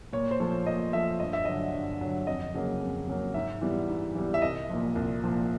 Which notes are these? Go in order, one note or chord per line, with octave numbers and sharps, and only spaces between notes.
A#2 C#5
C5
F3 A3 C#5
A#2 D#5
F3 A3 E5
G2 D#5
E5
D3 F#3 D#5
G2
D3 F#3
F2 D#5
C#3 F#3 A#3
F2
C#3 F#3 A#3
G#2 E5
E3 G3 B3
G#2
E3 G3 B3
E5
C2 D#5
A#2 F3
C2
A#2 F3